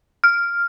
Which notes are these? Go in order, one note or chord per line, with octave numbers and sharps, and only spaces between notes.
F6